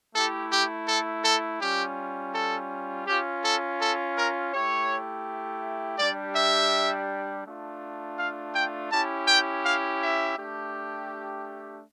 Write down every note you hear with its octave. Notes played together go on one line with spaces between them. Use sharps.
A3 E4 G4 A4
G4
A4
A4
G3 C#4 F4 G4
A4
C#4 F4 G4
A4
A4
A#4
A3 E4 G4 C#5
G3 D4 G4 D5
E5
A3 D4 F4
F5
G5
C#4 E4 G4 A5
G5
F5
E5
A3 D4 G4